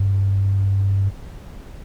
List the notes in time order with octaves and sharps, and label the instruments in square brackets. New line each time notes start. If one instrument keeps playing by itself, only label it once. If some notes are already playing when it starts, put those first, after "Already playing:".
Already playing: [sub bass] G2